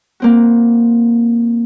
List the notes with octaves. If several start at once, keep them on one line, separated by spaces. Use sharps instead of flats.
A#3 C4 F#4